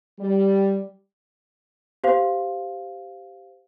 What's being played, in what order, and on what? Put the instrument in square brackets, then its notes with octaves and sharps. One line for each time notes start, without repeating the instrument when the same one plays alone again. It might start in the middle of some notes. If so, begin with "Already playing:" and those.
[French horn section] G3
[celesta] G4 C5 F5